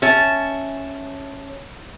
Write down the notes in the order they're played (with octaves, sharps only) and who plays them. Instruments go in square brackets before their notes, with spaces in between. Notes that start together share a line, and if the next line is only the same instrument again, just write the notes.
[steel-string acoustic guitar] C#4 E5 G#5 A5